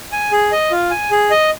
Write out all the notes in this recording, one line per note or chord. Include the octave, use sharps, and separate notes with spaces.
G#5
G#4
D#5
F4
G#5
G#4
D#5